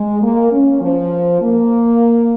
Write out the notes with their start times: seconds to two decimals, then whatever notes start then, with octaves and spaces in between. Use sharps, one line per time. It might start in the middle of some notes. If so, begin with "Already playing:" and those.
Already playing: G#3
0.22 A#3
0.51 C#4
0.81 F3
1.41 A#3